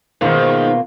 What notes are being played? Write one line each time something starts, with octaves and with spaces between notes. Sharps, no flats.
G#2 B2 D#3 A#3 F4